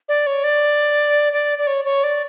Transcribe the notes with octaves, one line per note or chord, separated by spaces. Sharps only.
D5
C#5
D5
D5
D5
C#5
C#5
D5